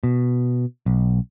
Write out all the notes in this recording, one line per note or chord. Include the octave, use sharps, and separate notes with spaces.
B2
B1